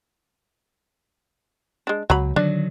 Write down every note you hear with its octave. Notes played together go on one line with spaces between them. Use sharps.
G#3 D4
C#2 F#3 A#5 B5
D3 D#3 F#3 D4